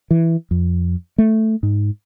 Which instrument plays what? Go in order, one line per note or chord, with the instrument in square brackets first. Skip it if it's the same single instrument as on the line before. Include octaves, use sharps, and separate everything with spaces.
[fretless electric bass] E3
F2
A3
G#2